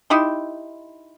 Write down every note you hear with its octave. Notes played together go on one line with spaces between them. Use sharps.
D#4 E4 G4 C6